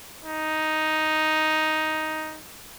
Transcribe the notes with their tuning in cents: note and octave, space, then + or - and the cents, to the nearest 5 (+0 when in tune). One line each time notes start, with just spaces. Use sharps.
D#4 +5